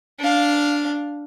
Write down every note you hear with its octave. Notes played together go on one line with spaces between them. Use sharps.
D4 F5